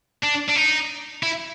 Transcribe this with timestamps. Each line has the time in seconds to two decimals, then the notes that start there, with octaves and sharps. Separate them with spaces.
0.24 D4
0.49 D4
0.56 D#4
1.23 E4